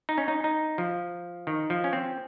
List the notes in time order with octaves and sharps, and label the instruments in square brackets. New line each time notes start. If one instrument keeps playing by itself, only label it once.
[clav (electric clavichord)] D#4
C#4
D#4
D#4
F3
D#3
F3
C#4
C4